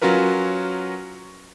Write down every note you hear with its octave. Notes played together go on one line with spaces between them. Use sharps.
F#3 C#4 F4 F#4 A#4 B4